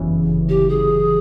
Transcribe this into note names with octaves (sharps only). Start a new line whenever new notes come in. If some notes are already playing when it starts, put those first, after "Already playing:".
Already playing: G1 F#2 C#3 E3
G4
G1 F#2 C#3 E3 G#4